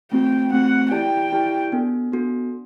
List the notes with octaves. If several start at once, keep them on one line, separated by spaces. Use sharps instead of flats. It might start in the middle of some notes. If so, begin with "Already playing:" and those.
A3 C4 F#4 G5
A3 C4 F#4 F#5
E4 G4 D5 G5 A5
E4 G4 D5 A5
B3 D4 F#4 A4
B3 D4 F#4 A4